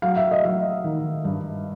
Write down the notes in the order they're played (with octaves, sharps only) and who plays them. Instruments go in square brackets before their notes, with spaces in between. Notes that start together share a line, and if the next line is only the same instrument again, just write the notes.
[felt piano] F#3 F5
E5
D#5
F#3 E5
D#3
G2